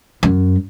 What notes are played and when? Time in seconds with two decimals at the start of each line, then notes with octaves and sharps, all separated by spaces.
0.23 F#2